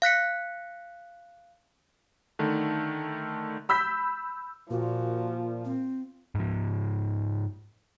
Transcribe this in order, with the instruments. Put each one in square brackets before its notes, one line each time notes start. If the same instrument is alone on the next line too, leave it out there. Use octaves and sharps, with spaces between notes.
[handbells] F5 F#6 B6 C#7
[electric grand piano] D3 D#3 A3
[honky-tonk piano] B5 E6 G6 B6
[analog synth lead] A#2 [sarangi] F3 [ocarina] F#4
[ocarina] C4
[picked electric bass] G#2 F3